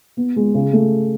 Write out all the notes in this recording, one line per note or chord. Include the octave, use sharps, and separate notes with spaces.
B3
G#3
C#3
A3